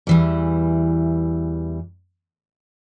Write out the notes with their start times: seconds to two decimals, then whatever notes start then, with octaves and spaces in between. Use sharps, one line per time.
0.07 E2 E3 G3